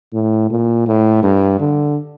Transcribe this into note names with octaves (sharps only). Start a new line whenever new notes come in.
A2
A#2
A2
G2
D3